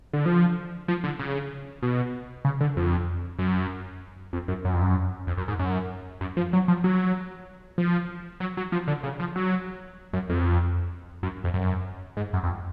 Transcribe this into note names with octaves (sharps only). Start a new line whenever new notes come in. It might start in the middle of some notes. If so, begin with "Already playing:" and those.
D3
F3
F3
D3
C#3
B2
C#3
D3
F2
F#2
F2
F#2
F#2
F2
F#2
F2
F#2
G#2
F#2
F#2
F3
F#3
F3
F#3
F3
F#3
F#3
F3
D3
C#3
F3
F#3
F#2
F2
F#2
F2
F#2
G#2
F#2
F2